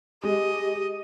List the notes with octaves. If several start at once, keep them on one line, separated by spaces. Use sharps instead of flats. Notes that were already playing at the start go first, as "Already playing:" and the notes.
G#3 G4 D#5